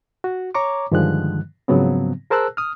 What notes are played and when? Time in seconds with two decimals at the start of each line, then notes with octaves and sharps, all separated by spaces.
0.24 F#4
0.55 C#5 A#5 C#6 D6
0.92 G2 D3 D#3 F3 G#3 F#6
1.68 G#2 C#3 F3 F#3 B3 C4
2.30 G#4 A#4 C5 A5 E6 F#6
2.57 D#6 F6